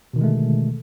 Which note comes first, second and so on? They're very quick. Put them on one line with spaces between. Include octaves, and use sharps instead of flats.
B2 D#3 D3 G#3 A3